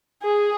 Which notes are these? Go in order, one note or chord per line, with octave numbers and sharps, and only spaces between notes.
G#4